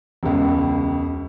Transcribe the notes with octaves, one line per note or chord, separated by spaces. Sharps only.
E1 C#2